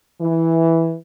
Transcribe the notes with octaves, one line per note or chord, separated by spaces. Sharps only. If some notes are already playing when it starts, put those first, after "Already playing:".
E3